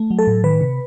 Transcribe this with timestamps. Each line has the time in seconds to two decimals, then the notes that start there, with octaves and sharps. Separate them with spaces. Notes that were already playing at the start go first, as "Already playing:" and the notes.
Already playing: A3
0.10 F#3
0.19 A4
0.27 A2
0.44 D#3 B4
0.61 C3